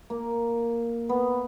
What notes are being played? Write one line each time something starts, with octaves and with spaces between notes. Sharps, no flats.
A#3
B3